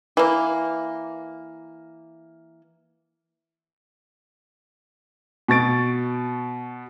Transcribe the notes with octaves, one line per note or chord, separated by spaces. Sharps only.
E3 A#3
B2 C#6 A6 D7